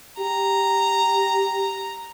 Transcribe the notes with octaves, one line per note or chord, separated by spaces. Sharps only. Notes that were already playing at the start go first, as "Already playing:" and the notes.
G4 A#5